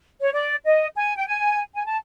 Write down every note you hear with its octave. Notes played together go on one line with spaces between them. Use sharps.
C#5
D5
D#5
G#5
G5
G#5
G#5
A5